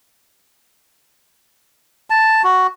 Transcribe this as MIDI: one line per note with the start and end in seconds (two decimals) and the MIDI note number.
2.10 2.42 81
2.44 2.67 66